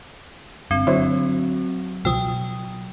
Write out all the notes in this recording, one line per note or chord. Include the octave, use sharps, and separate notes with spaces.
G1 G2 C4
D3 F#3 E4 C5 C#5
C#2 B2 F3 G5 D#6 E6